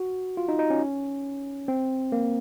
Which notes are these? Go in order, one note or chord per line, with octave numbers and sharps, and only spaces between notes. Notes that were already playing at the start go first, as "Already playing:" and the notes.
Already playing: F#4
F4
D#4
D#4
C#4
C4
A#3